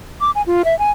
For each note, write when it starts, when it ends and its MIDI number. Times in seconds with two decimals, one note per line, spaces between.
0.21 0.31 86
0.35 0.42 80
0.47 0.62 65
0.65 0.77 76
0.79 0.91 80